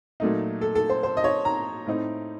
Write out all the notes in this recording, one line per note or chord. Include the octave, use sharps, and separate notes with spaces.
A#2 F#3 A3 D#4
A4
A4
C5
C5
D#5
C#5
A#5
A2 A3 C4 D#4